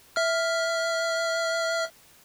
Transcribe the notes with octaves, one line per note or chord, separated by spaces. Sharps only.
E5 F6